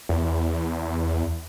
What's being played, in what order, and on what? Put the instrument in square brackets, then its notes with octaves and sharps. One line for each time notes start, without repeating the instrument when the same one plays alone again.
[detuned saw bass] E2